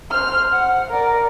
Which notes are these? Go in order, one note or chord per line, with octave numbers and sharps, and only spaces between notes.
C5 F6
F#5
A#4 D5